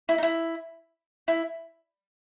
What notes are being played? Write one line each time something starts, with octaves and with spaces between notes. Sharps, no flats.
E4
D#4
E4
E4